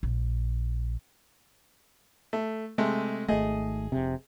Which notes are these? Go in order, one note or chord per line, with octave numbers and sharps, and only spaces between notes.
A#1
A3
C3 G#3 A3
G#1 A3 G#4 D#5
F1 C3